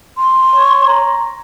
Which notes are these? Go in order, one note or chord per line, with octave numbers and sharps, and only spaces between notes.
C6
C#5
A#5